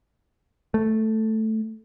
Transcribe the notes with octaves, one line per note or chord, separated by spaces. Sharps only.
A3